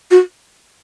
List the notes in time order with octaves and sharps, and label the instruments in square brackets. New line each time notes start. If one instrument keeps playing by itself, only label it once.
[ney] F#4